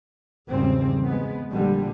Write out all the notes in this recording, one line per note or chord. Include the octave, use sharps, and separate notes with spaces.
G#1 E2 C#3 G3 C4
G#3 B3
A#1 A#2 D3 F3 G3